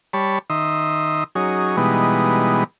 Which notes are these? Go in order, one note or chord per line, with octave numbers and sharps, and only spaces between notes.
G3 C#5 A5 B5
D#3 E5 C6 D#6
F#3 C#4 D#4 G#4
B2 E3 G3 G#3 B3 D#4